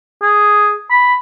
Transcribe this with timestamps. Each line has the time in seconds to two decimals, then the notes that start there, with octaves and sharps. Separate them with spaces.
0.22 G#4
0.90 B5